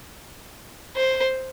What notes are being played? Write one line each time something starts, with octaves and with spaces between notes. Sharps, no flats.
C5